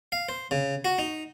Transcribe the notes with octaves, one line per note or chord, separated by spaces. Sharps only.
F5
C5
C#3
F#4
D#4